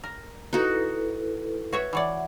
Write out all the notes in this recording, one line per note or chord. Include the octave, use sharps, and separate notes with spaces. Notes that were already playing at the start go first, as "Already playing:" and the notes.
A#4
D#4 E4 F#4 A4 B4
F#4 B4 C#5 E5
E3 C#5 D5 E5 F#5